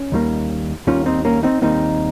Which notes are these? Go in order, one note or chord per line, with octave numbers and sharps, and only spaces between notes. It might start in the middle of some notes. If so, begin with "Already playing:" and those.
Already playing: C#4
D#2 D#3 G3 A#3
D#2 D#3 G3 A#3 C#4 F4
C4 D#4
A#3 C#4
C4 D#4
D#2 D#3 G3 A#3 C4 D#4